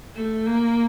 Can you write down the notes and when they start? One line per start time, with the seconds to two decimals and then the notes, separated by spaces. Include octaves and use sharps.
0.14 A3
0.46 A#3